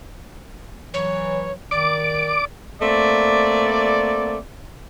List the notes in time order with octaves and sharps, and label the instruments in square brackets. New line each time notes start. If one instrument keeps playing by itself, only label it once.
[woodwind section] E3 F#3 [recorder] C#5
[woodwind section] D#3 [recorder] D5 [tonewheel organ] D6
[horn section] A3 A#3 C4 D5